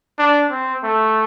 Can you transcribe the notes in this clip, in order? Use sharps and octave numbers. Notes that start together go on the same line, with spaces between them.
D4
C4
A3